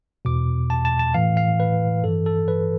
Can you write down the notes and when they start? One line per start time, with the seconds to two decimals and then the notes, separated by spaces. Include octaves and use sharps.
0.25 E2 B2 D6
0.70 A5
0.85 A5
0.99 A5
1.14 A2 E3 F5
1.37 F5
1.60 B4
2.04 G2 E3 A4
2.26 A4
2.48 B4